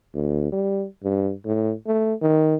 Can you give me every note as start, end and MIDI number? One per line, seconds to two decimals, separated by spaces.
0.15 0.50 38
0.52 0.85 55
1.03 1.31 43
1.45 1.72 45
1.87 2.14 57
2.22 2.55 51